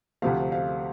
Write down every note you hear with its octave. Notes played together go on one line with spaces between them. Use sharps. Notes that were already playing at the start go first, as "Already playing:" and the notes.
D2 C3 F3 A3 F5
F5